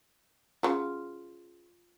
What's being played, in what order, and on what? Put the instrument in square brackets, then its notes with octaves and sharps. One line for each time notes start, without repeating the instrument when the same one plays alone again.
[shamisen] C#3 F#3 [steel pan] F4